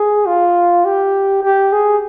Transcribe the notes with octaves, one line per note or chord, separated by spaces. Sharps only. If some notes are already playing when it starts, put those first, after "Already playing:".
Already playing: G#4
F4
G4
G4
G#4